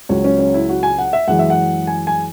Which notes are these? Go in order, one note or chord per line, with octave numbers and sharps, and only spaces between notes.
C#2 C#3 F#3 C#5
C#4
C#4
E4
F#4
G#5
F#5
E5
F#2 E3 G#3 F#5
E5
F#5
G#5
G#5